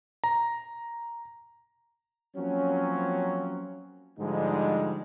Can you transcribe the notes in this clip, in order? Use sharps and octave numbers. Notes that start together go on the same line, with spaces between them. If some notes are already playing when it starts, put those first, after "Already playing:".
A#5
F3 F#3 A#3 C4 C#4
G#2 D3 F3 G3 G#3 D#4